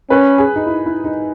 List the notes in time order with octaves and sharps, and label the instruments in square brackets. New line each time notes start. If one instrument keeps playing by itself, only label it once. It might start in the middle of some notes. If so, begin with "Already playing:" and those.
[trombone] C#4 [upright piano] B4
[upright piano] G#4
D#4
E4
E4
D#4